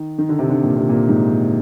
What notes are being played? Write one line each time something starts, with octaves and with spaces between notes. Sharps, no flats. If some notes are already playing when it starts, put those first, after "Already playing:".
Already playing: D#3
D#3
D3
C3
D3
A#2
C3
A#2
G#2